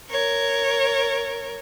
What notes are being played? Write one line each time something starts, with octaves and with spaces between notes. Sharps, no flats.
A#4 C#5